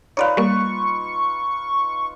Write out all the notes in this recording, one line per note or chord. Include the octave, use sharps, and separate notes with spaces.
D#4 F4 B4 C#5 D5 F5
G3 A#3 C#6